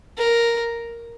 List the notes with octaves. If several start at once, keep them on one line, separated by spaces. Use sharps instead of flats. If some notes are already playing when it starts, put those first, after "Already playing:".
A#4